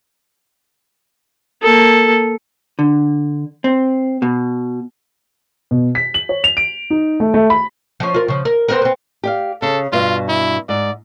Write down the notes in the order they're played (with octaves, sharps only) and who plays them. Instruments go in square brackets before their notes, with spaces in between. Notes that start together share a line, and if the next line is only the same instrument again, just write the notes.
[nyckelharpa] A#3 A4
[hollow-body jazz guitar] D3
C4
B2
[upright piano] B2
B6
F#7
C#5
F7
D7
D#4
A3
A3
B5
[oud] F3 C#4
F4 A#4
C#3 F3
A#4
B3 C4 A#4
B3 C4
[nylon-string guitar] G4 D5 F5
[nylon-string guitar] C#3 [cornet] A4
[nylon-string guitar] G2 B2 [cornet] F4
[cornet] E4
[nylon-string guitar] G#2 [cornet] D5